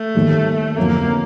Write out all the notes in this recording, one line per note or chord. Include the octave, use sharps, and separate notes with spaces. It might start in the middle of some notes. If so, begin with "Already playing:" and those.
Already playing: A3
D#2 D#3 G3
F2 D3 F#3 A#3 B3